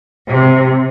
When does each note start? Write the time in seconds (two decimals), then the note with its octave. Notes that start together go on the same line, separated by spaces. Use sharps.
0.26 C3